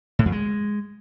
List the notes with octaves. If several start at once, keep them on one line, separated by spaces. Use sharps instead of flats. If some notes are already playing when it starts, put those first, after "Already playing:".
A2
F2
G#3